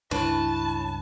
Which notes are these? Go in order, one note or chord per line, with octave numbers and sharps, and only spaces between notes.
C#2 G2 D4 E4 B4 C#5 A5 C#6